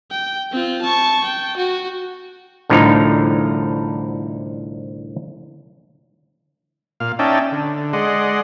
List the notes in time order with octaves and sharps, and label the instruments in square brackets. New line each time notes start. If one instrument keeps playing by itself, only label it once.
[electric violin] G5
C4 F4
A5 C#6
G5
F#4
[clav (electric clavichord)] C2 A2 D3 F3 D#4 A#5
[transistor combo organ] A#2 F5
C#4 D#4 D5 E5 G5 A5
D3
G#3 D5 D#5 F#5 C6